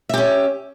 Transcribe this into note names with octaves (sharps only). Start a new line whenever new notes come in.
C#4 G4 E5